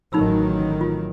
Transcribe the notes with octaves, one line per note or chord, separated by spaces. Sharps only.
A1 D#3 F#3 D#4 B5 E6
F4